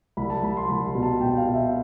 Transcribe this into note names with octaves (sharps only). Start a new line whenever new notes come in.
C2 B5
A5
C2 B5
C6
C2 B5
B2
A5
B2 G5
F5
B2
E5